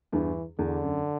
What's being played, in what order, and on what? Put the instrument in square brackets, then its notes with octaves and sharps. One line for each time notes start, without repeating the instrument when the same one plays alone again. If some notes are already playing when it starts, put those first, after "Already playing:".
[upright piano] E2 G2 [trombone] E3
[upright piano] E2 [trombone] D3
[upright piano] F#2